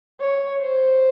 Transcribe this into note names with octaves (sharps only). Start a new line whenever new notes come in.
C#5
C5